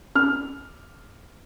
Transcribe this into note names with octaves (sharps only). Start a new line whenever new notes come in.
F6